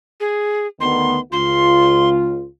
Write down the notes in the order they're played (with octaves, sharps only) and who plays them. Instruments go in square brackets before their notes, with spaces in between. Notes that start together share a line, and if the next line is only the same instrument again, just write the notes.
[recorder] G#4
[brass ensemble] D2 D#3 B3 [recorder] C6
[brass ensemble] C#2 F4 [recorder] C6